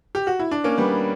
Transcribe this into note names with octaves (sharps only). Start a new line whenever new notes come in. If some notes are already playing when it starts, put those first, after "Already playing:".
G4
F#4
E4
D4
A#3 C#4
G3 B3